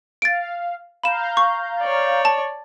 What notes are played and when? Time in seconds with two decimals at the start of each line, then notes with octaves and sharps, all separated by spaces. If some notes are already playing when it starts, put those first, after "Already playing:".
0.22 F5 A6 D7
1.03 F5 A#5 B5 G6 E7
1.37 C#6
1.80 C#5 D5
2.25 A5